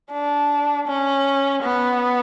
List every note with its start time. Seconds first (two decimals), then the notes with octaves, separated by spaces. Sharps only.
0.12 D4
0.88 C#4
1.63 B3